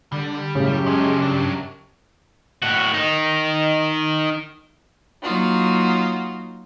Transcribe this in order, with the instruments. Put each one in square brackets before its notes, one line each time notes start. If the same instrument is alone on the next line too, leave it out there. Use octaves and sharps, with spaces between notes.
[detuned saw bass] D3 [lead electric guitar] G3
[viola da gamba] F#2 G4 [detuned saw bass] A2 [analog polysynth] C#3
[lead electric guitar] F3 C#4 [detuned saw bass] G#3
[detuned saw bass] G2 [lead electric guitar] F#3 D4
[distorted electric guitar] A2 F#4
D#3 D#4
[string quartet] F#3 A#3 D#4 F4 F#4